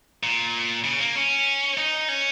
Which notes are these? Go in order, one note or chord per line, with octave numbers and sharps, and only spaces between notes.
A#2
C#3
A#3
C#4
D#4
C#4